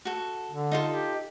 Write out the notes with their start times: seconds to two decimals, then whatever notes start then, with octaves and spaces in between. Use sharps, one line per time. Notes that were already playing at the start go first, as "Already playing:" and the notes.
0.05 F#4 A4
0.50 D3
0.71 D#4 F4 A4
0.87 G4